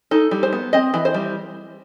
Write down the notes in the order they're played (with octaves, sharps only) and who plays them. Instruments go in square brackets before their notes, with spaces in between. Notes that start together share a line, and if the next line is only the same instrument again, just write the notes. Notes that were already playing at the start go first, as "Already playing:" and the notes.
[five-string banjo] D#4 A4
G3
C5
B3
C4 D#5
E3
C5
G3